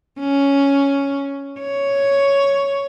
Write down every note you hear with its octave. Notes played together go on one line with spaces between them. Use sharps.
C#4
C#5